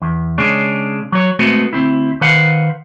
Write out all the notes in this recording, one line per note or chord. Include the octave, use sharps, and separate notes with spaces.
E2
C#3 G#3 C#4 D4
F#3 C#5
G#3 A3 B3 C4 F#4
D2 C4 E4
D#3 B4 C5 F5 F#5